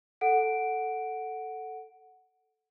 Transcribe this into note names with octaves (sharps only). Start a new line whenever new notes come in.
A4 F#5 D7